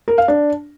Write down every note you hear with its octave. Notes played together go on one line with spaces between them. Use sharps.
A#4
F5
D4